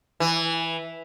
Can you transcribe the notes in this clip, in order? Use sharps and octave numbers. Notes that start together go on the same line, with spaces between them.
E3